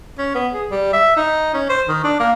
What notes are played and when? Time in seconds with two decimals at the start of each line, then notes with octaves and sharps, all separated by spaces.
0.18 C#4
0.35 B3
0.54 G#4
0.71 G3
0.93 E5
1.16 D#4
1.54 C#4
1.69 C5
1.88 D#3
2.04 D4
2.20 A#3